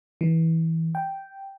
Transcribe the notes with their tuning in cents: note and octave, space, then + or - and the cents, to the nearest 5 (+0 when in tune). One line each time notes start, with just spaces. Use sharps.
E3 -20
G5 -5